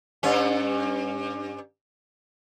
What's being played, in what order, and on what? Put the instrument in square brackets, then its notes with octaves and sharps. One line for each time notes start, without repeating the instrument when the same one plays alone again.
[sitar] G2 C#4